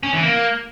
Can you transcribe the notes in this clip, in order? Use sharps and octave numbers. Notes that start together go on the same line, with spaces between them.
C#4
E3
A#3